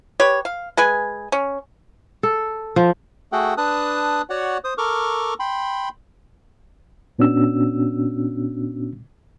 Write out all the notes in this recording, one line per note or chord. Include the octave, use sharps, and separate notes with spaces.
G4 B4 C#5
F5
G#3 B4 G#5
C#4
A4
F3
A3 F#4 G#4 A4 F#5 G5
D4 B4 A5 D#6 F#6
F#4 C#5 D5 F#5
C5 D#6
A4 A#4 C#6 D6 F6
G5 B5 C6
A#2 B3 C#4 D4 F#4 E6